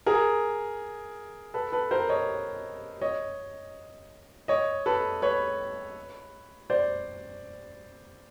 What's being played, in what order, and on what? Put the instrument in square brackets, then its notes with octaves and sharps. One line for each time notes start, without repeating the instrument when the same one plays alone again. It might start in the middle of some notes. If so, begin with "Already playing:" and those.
[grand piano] G#4 A#4
A4 B4
A4 B4
A#4 C5
C#5 D#5
C#5 D#5
C#5 D#5
A4 B4
B4 C#5
C5 D5